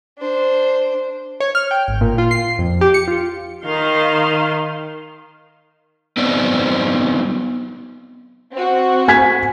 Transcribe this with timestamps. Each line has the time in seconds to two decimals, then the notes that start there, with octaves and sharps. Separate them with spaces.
0.18 D4 C5
1.40 C#5
1.55 F6
1.71 G5
1.88 G#1
2.01 A#2
2.18 F4
2.31 C7
2.59 F2
2.81 G4
2.94 C#7
3.08 F4
3.64 D#3 F5 C6
6.17 F#3 B3 C4 D#4 C5 D5
8.53 C4 F#4
9.08 G#5 G#6 B6